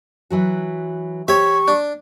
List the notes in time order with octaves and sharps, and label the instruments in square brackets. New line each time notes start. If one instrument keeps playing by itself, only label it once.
[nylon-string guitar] E3 F#3 F#4
[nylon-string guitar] G4 C5 [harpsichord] C#5 E5 [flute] C#6
[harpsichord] D4